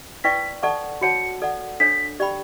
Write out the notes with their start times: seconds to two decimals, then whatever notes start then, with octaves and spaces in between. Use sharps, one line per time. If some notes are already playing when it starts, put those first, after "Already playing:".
0.24 E4 B4 D5 G5 C#6 B6
0.63 A4 D5 F#5 A5 C#6
1.01 F#4 C#5 F#5 A5 C#7
1.42 A4 D5 F#5
1.80 D4 A4 C#5 B6
2.20 G4 D5 G5 B5